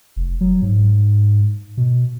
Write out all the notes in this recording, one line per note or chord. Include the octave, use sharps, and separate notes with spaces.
F1
F#3
G#2
B2